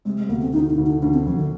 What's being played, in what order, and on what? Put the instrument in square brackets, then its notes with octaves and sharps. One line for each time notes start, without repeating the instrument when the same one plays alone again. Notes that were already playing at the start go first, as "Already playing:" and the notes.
[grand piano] C3 [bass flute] G#3
[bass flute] G#3
[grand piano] D2 [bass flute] A#3
[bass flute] C4
[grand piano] D2 [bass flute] D#4
[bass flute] D#4
[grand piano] D2
[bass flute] D#4
[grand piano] D2 [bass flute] D4
[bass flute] C4
[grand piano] D2 [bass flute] F3
[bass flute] D#3